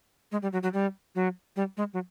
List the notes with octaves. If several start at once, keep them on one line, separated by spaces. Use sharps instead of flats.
G#3
G3
F#3
F#3
G3
F#3
G3
G#3
F#3